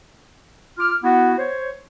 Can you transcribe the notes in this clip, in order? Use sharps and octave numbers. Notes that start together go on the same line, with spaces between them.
F4 D6 F6
B3 E4 F#4
C5 C#5